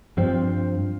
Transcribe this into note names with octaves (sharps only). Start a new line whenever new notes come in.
G2 F3 C4